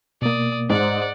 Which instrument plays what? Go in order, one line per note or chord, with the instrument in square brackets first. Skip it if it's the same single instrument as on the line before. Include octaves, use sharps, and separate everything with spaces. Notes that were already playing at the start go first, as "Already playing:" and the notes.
[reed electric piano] B2 A#3 [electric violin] D5 D#6
[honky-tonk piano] G#2 [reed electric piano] C5 [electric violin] D5 F#5